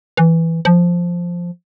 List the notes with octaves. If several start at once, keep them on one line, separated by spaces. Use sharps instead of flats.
E3
F3